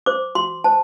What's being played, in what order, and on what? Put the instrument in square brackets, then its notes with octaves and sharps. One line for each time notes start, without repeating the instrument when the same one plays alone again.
[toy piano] C5 D6
F#4 C6
C5 A5